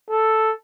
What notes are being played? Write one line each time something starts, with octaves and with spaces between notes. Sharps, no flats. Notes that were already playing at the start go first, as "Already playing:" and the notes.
A4